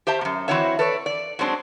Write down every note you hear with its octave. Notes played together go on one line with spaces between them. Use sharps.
G4 C5 E5 A5
F#2 A#2
E3 C4 E4 F#4 C#5 E5
A4 B4 C#5 D5
D5
F#3 G#3 C4 D4